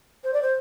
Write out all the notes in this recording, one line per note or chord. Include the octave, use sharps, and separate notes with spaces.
C5
D5
C5